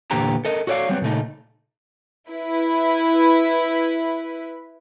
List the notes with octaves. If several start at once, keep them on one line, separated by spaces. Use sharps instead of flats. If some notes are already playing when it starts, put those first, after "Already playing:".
E2 A#2 D3 B3 G4 A#5
A4 A#4 D#5
F#4 A4 C#5 D5 F5
F#3 G3 B3 C4
A#2 C#3 A3 D#4
E4 B4